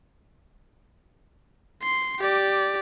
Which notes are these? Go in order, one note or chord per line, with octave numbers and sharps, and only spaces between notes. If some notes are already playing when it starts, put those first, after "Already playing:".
C6
G4 D5